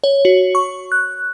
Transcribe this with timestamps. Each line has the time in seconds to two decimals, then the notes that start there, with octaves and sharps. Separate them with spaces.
0.04 C#5
0.25 F#4
0.55 C#6
0.92 F#6